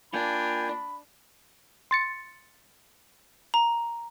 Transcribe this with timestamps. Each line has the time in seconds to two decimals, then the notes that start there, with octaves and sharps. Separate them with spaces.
0.13 A#3 D4 F4 G5 G#5 B5
1.91 C6 A6 C#7
3.54 A#5